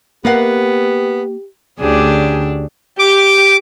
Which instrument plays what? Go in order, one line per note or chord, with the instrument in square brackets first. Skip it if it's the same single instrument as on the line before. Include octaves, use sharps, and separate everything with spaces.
[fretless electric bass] A#3 [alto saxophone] B3 [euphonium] G4 [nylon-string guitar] A#4 F5 F#5
[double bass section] D2 [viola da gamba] D3 C#4 D4 [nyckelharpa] G4 G#4
[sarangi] G4 [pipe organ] D6